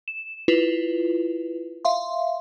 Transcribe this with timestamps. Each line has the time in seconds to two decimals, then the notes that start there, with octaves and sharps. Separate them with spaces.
0.08 E7
0.48 E4 F4 B4
1.85 E5 F5 C6